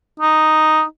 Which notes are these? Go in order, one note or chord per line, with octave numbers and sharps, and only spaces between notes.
D#4